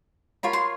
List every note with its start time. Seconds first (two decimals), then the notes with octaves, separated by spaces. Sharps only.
0.43 F4 A#4 C#5 B5
0.53 C6